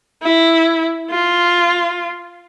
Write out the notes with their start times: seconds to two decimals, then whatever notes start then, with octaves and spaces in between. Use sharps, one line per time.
0.23 E4
1.11 F4